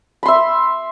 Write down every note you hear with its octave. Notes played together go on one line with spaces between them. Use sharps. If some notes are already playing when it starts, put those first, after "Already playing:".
E5 B5 C6